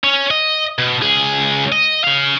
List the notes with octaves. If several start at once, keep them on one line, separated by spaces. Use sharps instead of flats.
C#4
D#5
B2
C#2 G#4
D#5
C#3 F5